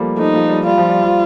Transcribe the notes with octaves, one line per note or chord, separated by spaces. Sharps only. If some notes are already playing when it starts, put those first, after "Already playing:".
Already playing: F3 G3 A3 A#3
F3 A3 D#4
F3 A3
G3
G3 F4
F3
G3
F3